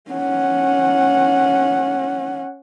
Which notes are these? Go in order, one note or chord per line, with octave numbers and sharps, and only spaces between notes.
C#4 F#5